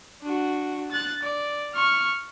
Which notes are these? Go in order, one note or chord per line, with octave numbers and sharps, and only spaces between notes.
D4 F#4
F#6 A6
D5
C#6 F6